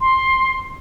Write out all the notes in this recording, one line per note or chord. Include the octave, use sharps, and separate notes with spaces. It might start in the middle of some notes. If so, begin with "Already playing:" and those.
C6